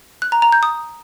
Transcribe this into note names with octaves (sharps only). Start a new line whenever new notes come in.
F#6
A#5
A#5
G6
D#6